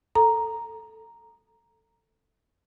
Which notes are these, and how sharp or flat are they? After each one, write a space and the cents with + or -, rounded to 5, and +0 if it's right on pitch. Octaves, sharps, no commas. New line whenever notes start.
A4 +15 A#5 +0